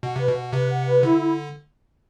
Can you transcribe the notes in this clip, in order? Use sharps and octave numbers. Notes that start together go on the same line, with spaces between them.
B2 F#5
C3 B4
B2
F#5
C3 B4
F#5
B4
D3 E4
E4